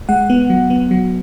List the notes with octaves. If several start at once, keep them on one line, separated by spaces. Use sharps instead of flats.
G#3 F#5
B3
F#3
B3
F#3